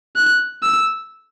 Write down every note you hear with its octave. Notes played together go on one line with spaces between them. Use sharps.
F#6
E6